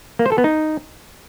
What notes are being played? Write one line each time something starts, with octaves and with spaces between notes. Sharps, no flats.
A#3
C5
A4
B3
D#4